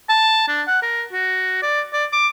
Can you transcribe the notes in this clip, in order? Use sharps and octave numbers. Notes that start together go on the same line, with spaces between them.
A5
D4
F#5
A#4
F#4
D5
D5
D6